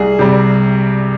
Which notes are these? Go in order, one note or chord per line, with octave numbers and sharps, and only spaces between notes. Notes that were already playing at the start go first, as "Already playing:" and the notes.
Already playing: C2 G#4
C3 G3